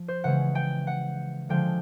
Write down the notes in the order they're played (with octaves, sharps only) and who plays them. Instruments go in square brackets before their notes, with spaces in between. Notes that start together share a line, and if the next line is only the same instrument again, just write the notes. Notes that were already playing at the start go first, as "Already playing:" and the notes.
Already playing: [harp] F3
C5
C#3 E3 G#3 F#5
G5
F#5
D3 F3 G#3 G5